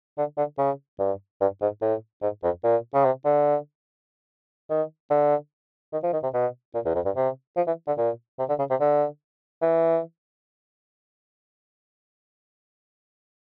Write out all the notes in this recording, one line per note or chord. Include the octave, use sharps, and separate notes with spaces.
D3
D3
C#3
G2
G2
G#2
A2
G#2
F2
A#2
C#3
C3
D3
D#3
D3
D#3
F3
D#3
C3
B2
A#2
E2
F2
G2
C3
F3
E3
D3
A#2
C3
D3
C#3
C3
D3
E3